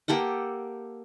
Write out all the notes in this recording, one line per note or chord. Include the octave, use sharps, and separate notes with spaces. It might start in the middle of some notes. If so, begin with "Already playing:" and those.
A#3 G4 A4 F#5